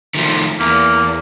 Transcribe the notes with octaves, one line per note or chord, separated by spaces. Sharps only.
D#3 F3 A3
E2 A#3